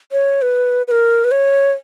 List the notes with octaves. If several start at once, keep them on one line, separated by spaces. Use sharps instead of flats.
C#5
B4
B4
A#4
B4
C#5